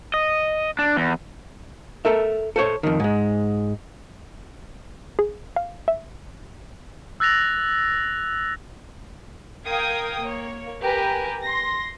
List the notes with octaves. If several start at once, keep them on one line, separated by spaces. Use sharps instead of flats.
D#5
D4
E2
A4 A#4 E5
A4 C5 C#5
F2 D#3
G#2 G#3
G#4
F5
E5
E6 F#6 A6 A#6 F7
A#4 F5 G5 D#6 G#6
A#3 C#5
G4 A#4 B4 G#5 A#5
C6 A#6